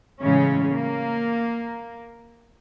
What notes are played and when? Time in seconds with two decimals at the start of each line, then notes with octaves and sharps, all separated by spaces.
0.22 A2 C#3 E3 G#3 C#4
0.70 A#3